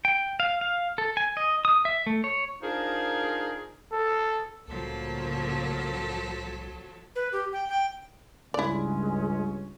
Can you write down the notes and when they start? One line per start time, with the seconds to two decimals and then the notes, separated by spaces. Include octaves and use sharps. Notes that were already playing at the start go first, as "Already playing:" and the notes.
0.05 G5
0.40 F5
0.61 F5
0.98 A4
1.17 G#5
1.37 D#5
1.65 D#6
1.85 E5
2.07 A3
2.24 C#5
2.61 D4 D#4 F4 G#4 A#4 C5
3.92 A4
4.68 C2 A2 C#3 F3 F#3 A#3 A4
7.16 B4
7.32 G4
7.52 G5
7.69 G5
8.54 C#2 G2 G#3 C#4 E4 D5